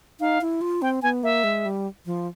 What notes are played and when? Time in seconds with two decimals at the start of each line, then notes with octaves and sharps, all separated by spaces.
0.20 D#4 F5
0.41 E4
0.61 F4
0.82 C4 G5
1.02 B3 G#5
1.23 A#3 E5
1.44 G#3
1.65 G3
2.06 F3